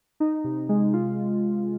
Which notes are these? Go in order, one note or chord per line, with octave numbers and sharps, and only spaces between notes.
D#4
C3
G#3
F4